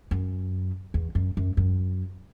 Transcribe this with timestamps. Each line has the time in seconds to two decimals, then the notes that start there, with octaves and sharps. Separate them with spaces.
0.11 F#2
0.94 E2
1.15 F#2
1.37 F#2
1.57 F#2